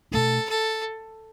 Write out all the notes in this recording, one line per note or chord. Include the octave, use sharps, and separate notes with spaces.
B2 A3 D4 A4
A4